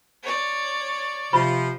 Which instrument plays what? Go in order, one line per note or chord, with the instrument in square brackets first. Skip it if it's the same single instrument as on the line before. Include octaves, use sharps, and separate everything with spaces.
[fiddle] C#5 D5
[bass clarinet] C3 [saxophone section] F3 [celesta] B5